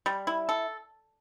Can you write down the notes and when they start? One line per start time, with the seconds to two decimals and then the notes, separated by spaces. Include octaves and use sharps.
0.06 G3
0.27 E4
0.49 A4